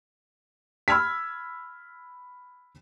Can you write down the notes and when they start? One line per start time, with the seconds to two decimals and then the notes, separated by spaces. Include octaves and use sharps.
0.88 B5 E6 F6 G#6 B6